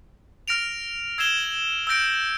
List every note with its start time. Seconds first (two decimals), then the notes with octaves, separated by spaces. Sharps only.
0.48 F6 A#6 D7 F7
1.18 E6 G#6 C7 E7 G7
1.87 E6 G6 A#6 D7